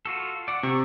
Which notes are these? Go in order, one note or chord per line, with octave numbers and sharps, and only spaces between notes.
F4 F#4 A4
D5 F#5
C3 C#6